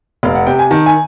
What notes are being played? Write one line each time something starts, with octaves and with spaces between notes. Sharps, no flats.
F1 F5
F#5
C3 G5
G#5
D#3 A5
G#5